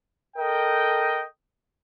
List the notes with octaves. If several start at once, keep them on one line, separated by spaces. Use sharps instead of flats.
A4 A#4 D#5 G5